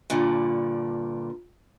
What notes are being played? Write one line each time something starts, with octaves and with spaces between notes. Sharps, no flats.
G2 A#2 D3